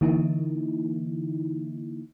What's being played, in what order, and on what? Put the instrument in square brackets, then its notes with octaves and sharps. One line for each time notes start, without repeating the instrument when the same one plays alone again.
[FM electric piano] D3 E3 A#3 D#4 E4